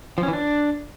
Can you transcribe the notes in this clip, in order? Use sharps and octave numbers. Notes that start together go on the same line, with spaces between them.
F3
C#4
E3
D4